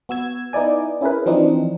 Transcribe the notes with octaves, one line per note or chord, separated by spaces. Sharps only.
B3 F#4 E6 G#6
B3 D#4 E4 D5 G#5
C#4 E4 G#4 A#4 B4
E3 F3 C4 D4 D#4